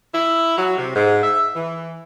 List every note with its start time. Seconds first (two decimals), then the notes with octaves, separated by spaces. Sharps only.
0.13 E4
0.58 F#3
0.77 C3
0.95 G#2
1.23 E5
1.56 E3